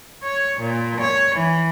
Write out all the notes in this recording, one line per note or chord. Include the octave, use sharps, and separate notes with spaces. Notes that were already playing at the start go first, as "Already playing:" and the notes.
C#5
A#2
C#5
E3